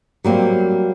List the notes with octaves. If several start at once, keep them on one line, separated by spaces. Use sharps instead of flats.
F#3 G3 A#3 C4